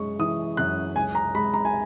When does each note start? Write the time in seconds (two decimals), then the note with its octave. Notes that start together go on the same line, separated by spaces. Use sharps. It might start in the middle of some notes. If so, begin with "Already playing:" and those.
Already playing: F#2 G#3 C#6
0.19 E3 D#6
0.57 F#2 F#6
0.95 C#2 G#5
1.15 A#5
1.35 G#3 B5
1.54 A#5
1.65 G#5